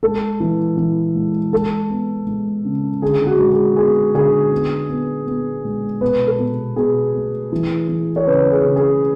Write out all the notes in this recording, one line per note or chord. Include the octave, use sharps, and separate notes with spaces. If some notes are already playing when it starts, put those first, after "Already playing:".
G#3 A4
E3
E3
G#3
G#3 A4
B3
G#3
C#3
D3 G#4
G#4
F#4
G#3
G#4
B3 G#4
D3 G#4
B3
B3
B3
G#3
B2 B4
A4
B2
B2 G#4
A3
E3
E3
C#5
C#3 B4
G#4
C#3
G#4